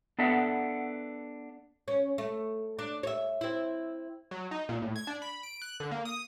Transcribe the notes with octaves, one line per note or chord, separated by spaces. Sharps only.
B3 D4 A4 E5 F#5
C#4
A3
D4
C#5 E5
C4 E4
F#3
D#4
A#2
A2
G#6
D4
B5
D7
F#6
D3
A#3
D#6